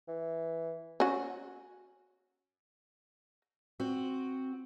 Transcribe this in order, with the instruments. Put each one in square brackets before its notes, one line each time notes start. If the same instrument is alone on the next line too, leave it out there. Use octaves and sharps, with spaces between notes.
[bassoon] E3
[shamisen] C#4 F#4
[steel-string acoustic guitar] C4 F#4